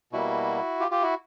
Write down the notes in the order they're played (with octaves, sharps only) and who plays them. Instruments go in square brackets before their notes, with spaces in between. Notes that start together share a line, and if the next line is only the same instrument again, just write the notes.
[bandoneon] B2 G3 A#3 E4 F#4
F4 G4
F4 G4
E4 F#4